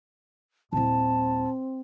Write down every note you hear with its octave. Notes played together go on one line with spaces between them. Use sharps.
D#1 C4 E4 A5